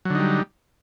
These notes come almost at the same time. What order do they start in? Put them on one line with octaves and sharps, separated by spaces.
F#3 D3 D#4 G3